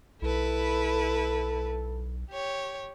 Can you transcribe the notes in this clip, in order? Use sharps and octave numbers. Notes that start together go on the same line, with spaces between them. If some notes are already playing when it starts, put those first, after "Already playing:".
B1 E4 A4 B4
G4 C#5